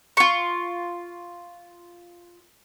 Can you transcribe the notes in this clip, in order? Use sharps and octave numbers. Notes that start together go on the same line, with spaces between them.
F4 C#6